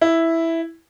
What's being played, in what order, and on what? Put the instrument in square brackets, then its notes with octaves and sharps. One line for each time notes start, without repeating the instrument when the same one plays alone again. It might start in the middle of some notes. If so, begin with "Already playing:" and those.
[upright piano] E4